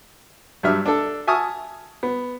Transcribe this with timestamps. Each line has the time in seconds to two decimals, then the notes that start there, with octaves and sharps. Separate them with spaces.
0.63 G2 F#3 G3 D4 E5 F6
0.86 D4 A4
1.27 E5 G#5 A5 C#6 D#6 F6
2.03 B3